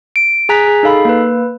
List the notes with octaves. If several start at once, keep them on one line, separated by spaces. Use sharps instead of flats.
D7
G#4 G#5 A#5 F#6 B6
G#4
D#4 A4 F5 B5
A#3 B4